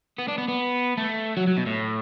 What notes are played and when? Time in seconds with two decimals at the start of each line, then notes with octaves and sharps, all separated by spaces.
0.19 B3
0.28 D4
0.38 B3
0.48 B3
0.97 A3
1.37 F#3
1.47 F#3
1.57 B2
1.66 A2